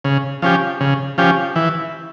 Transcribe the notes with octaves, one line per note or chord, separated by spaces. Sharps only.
C#3
F3 C#4 G4
C#3
F3 C#4 G4
E3